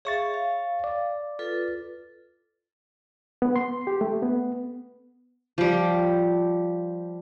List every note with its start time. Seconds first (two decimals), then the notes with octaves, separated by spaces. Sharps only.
0.05 G#4 C#5 E5 F5 C#6 A6
0.34 F5
0.84 D5
1.39 F4 A4 B4
3.42 B3
3.56 C6
3.87 G4
4.01 A3
4.22 B3
5.58 F3 G3